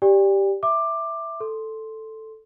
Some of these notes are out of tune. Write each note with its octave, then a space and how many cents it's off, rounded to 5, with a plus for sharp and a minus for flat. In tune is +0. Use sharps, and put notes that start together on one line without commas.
G4 +0 D5 +0 G5 +40
E5 +0 D6 +15
A4 +0 C6 +0